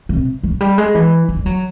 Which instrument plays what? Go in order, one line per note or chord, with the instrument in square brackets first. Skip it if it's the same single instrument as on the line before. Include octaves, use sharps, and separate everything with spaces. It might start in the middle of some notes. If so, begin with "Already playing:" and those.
[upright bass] C3
F#3
G3
G#3
E3
E3
G3
F#3